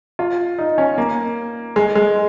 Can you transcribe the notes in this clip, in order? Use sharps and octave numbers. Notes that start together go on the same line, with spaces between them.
F4
D#4
C#4
A#3
G#3
G#3